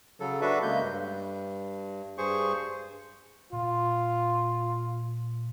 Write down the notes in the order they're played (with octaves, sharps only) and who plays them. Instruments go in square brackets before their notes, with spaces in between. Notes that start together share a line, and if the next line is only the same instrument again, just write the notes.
[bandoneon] C#3 F#3 A4
D4 F#4 A4 B4 E5
C#3 G#3 A#3 G6
G2
G2 G#4 C5 C#6
[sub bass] A#2 [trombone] F4